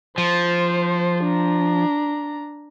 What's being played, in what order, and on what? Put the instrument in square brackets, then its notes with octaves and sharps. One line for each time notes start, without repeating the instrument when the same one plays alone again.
[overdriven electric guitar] F3 [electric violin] C5
[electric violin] D4 A#5